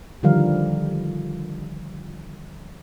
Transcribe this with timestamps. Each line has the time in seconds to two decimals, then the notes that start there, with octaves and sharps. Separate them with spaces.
0.23 D3 D#3 F3 G3 A#4 F5